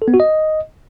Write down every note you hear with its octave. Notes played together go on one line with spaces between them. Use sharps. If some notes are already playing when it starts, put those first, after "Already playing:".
A4
B3
F#4
D#5